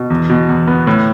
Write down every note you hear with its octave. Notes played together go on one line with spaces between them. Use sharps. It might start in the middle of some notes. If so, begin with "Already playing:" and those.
Already playing: B2
E2
B2
E2
B3
A2